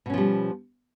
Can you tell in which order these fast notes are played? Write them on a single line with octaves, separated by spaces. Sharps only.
B2 C#4 F3 G3